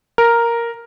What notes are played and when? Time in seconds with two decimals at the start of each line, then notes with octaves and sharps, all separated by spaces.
0.18 A#4